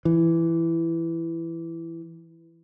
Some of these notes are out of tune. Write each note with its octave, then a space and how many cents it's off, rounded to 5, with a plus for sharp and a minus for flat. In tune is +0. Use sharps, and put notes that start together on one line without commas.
E3 +10